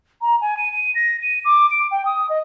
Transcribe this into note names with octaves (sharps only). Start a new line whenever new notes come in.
A#5
G#5
D#7
D#7
A#6
D#7
D6
D7
G5
D#6
D#5